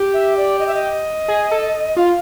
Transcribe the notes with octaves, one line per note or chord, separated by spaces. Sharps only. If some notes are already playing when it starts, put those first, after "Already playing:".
Already playing: G4
E5
D5
D#5
E5
D#5
G#4
A4
F4 F5